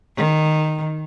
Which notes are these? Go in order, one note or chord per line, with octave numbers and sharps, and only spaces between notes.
D#3